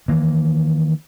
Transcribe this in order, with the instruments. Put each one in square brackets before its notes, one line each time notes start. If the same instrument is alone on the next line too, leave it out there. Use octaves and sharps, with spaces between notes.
[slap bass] D#3 E3 A#3